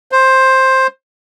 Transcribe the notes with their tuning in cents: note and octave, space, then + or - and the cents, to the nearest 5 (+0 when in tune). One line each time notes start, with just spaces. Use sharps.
C5 +10